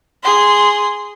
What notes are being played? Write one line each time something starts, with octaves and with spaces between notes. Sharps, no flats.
G#4 C6